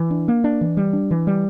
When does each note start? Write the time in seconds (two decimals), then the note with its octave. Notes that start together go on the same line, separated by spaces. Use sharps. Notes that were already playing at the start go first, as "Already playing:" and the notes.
Already playing: E3
0.11 D4
0.28 A#3
0.44 D4
0.61 E3
0.77 G3
0.93 D4
1.11 E3
1.27 G3